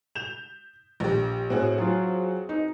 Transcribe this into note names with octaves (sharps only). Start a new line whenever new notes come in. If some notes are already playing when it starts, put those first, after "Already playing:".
G6 E7 F7
A#1 G4
A2 C4 F#4 G#4
F#3 F4
D#4